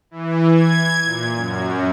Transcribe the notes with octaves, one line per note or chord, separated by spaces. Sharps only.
E3
G#6
A#2
F#2